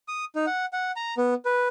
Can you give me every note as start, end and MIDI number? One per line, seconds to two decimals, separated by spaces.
0.08 0.25 87
0.36 0.46 63
0.47 0.66 78
0.73 0.91 78
0.96 1.14 82
1.17 1.34 59
1.45 1.68 71